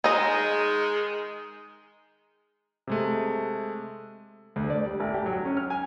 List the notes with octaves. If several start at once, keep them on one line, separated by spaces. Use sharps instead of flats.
D#3 G#3 D#4 D#5
C3 G#3 A3
D2
D5
G3
A1
G4
F#3
C#4
F6
G#5